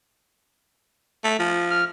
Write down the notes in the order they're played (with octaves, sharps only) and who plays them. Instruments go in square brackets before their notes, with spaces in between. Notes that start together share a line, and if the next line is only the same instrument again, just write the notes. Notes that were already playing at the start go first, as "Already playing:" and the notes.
[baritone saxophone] A3
F3
[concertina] F6